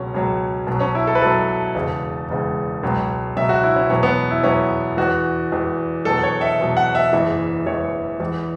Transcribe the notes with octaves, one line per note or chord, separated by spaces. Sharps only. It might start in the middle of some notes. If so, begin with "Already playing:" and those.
Already playing: C#2 B2 F#3 C#4
C#2 B2 F#3
B1 B2 F#3
C#4
E4
A4
B4
B1 B2 F#3 A4
E1 E2 C#3
E1 E2 C#3
C#2 B2 F#3
C#2 B2 F#3 E5
F#4
E4
C#4
E2 B2 F#3 C#4
B3
E4
E2 B2 F#3 C#4
E2 E3 F#4
E2 E3
E2 B2 F#3 A4
C#5
E5
E2 B2 F#3
F#5
E5
F#1 E2 E3
F#1 E2 E3 C#5
E2 E3